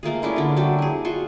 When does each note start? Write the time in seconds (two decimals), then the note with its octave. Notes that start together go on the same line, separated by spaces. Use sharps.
0.03 A3 A#3 F4 G#4
0.22 C#4 D4 E4 F4
0.36 D3 F4
0.56 F#3 G3 G4
0.79 E4 G#4
1.05 F4 F#4 C6 C#6